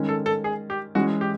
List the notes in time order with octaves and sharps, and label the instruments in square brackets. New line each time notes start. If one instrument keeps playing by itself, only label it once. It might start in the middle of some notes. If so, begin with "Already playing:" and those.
Already playing: [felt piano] D#3 G#3 C#4
[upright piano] A4
A4
G#4
G4
[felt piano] E3 G#3 C#4 [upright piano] F#4
[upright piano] G4